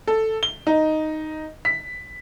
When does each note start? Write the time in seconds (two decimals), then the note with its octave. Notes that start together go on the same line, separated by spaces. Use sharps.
0.07 A4
0.43 G7
0.67 D#4
1.65 B6